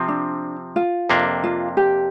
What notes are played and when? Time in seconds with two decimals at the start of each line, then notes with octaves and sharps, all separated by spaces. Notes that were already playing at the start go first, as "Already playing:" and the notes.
Already playing: C3 F3 C4
0.08 D4
0.76 F4
1.09 F2 C3 A#3 D4
1.44 F4
1.77 G4